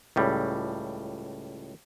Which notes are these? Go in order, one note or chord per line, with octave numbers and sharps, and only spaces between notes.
C#2 A2 G3